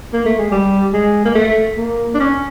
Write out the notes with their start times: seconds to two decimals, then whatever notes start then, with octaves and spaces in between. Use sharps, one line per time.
0.13 A#3
0.26 A3
0.38 G#3
0.51 G3
0.93 G#3
1.25 A#3
1.35 A3
1.78 A#3
2.14 D4
2.20 C#4